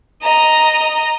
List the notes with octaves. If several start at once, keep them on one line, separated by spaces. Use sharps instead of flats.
D#5 A#5